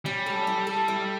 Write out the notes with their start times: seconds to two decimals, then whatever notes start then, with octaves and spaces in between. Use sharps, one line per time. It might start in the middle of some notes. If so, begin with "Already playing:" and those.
0.05 G3 C#4
0.26 A4
0.47 E4
0.67 A4
0.88 E4